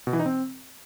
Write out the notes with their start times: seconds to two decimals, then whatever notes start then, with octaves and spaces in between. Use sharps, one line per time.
0.07 B2
0.13 E3
0.19 D#4
0.26 C4